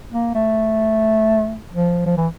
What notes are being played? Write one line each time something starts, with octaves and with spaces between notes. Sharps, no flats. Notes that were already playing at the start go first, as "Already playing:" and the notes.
A#3
A3
F3
F3
E3